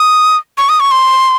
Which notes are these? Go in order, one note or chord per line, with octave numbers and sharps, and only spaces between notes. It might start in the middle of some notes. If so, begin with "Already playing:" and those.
Already playing: D#6
C#6
D#6
C#6
C6